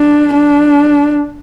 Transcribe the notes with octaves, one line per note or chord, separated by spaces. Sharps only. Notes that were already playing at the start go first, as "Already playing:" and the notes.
Already playing: D4
D4